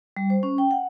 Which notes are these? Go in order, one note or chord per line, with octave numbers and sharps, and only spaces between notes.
G3
C5
C#4
G5
F#5